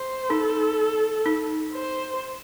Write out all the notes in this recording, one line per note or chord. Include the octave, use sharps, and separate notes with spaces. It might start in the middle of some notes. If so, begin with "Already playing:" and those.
Already playing: C5
D#4 A4
D#4
C5